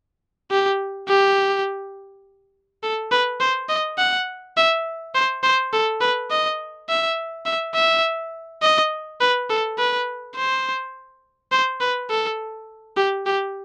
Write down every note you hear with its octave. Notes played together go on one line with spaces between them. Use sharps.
G4
G4
A4
B4
C5
D#5
F#5
E5
C5
C5
A4
B4
D#5
E5
E5
E5
D#5
B4
A4
B4
C5
C5
B4
A4
G4
G4